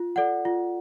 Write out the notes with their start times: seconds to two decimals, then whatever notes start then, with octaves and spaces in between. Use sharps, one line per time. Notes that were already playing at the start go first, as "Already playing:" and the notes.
Already playing: F4
0.16 A4 D5 F#5
0.45 F4